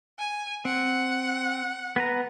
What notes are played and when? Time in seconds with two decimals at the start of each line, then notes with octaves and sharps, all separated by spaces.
0.19 G#5
0.65 C4 F#5
1.96 B3 B4 A#5